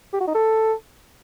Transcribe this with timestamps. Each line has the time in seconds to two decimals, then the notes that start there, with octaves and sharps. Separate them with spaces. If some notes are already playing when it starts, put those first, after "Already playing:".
0.13 G4
0.20 F#4
0.27 D#4
0.34 A4